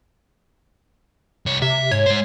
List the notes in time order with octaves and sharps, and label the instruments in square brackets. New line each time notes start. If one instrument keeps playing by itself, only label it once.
[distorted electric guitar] C2 C#5
[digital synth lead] C3 [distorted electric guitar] E5
[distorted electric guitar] G#2 [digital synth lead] C#5
[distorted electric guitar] G#3 C5